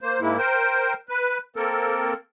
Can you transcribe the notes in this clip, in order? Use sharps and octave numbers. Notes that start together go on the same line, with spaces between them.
A#3 C5
G#2 G#3 A#3 E4
A#4 C5 G5
B4
A#3 C4 A4 A#4